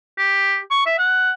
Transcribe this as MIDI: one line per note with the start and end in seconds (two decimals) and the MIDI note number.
0.18 0.59 67
0.71 0.82 85
0.86 0.98 76
0.99 1.31 78